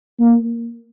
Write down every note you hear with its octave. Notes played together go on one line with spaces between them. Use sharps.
A#3